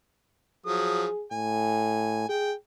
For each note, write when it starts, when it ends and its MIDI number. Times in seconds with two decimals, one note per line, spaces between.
0.66 1.06 53
0.66 1.06 54
0.66 1.24 68
0.66 1.06 87
1.32 2.25 45
1.32 2.26 80
2.29 2.54 68
2.29 2.52 79